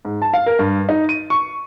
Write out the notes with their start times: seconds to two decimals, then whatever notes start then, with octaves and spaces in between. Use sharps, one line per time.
0.05 G#2
0.22 A5
0.33 F5
0.46 A#4
0.59 G2
0.89 D#4
1.09 D#7
1.30 C#6